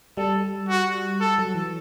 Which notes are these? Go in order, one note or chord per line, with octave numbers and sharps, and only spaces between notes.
G3 A4
F#4
A4
F#3
E3